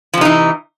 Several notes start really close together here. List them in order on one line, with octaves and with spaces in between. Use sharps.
F3 C3 D#4 E3